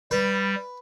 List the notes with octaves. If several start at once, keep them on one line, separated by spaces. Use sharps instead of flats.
G3 B4